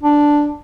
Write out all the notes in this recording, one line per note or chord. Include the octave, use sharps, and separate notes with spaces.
D4